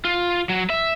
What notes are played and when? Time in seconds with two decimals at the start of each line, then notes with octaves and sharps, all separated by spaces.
0.05 F4
0.49 F#3
0.70 E5